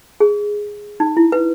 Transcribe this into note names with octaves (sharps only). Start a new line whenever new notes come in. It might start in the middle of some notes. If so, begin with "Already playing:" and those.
G#4
D#4
E4
B4